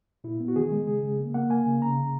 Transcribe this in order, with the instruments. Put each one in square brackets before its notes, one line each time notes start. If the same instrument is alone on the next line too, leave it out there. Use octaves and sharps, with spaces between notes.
[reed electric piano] A#2 E4
B3
F#4
D#3 G#4
G#3
C#3 G#4
C#3
A#3
A#3 F#5
A#3 G#5
C#3
C#3 A#5
C#3